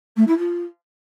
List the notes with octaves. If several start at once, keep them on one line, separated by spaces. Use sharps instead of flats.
A3
E4
F4